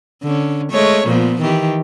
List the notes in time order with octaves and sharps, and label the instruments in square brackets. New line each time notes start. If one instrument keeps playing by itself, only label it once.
[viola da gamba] D3 C#4
G#3 A3 C#5
A#2 F3 B3
D#3 E3 G4